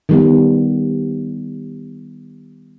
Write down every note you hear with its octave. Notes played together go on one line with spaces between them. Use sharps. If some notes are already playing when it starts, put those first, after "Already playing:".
D#3 G3 B3